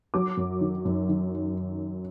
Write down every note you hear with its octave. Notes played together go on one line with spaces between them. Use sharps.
F#3 D6
F#2
D#3
F#2
D#3